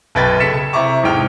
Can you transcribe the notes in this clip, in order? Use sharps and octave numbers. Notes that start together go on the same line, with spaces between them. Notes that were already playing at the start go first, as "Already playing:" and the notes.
B1 F#2 B4 G5 G#6 A6
C#3 A4 B6 C#7 E7
C3 E4 E5 A#5 C#6 D6
E2 G#2 C3 G5 F6